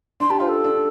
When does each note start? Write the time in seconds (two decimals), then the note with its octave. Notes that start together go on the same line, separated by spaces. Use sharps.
0.20 D4 C6
0.30 G4 A5
0.40 F4 C5
0.49 A4
0.64 D4